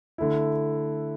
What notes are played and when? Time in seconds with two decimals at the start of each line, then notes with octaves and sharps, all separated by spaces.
0.18 D3 A3 E4